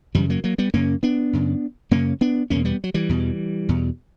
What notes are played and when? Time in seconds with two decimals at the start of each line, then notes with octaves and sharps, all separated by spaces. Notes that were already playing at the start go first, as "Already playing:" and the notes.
0.15 F#2 C#3 E3 G3
0.30 F#3 A#3
0.44 F#3 A#3
0.58 G3 B3
0.74 F#2 C#3 A#3 C#4
1.03 B3 D4
1.33 F#2 C#3
1.91 F#2 C#3 A#3 C#4
2.21 B3 D4
2.50 E2 B2 A#3 C#4
2.65 G3 B3
2.84 F#3
2.94 E3 G3
3.09 E2 B2
3.69 E2 B2